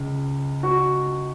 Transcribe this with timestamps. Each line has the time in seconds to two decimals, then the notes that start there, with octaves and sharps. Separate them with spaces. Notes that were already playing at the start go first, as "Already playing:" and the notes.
Already playing: C#2 C#3
0.63 F#4